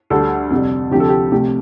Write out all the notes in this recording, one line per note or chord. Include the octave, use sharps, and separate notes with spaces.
D2 D3 G3 A4
F2 C3 G3
D2 C3 F3 G4
A4
G4
C2 C3 A3 G4